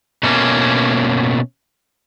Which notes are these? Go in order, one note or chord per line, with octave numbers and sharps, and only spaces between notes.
B2 A3 A#3 C#4